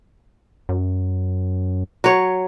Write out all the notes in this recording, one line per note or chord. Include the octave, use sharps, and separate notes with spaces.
F#2
F#3 C#5